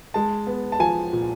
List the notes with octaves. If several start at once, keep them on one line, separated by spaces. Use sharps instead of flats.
G#3 A5
B3
A5
F3 G#5
A#2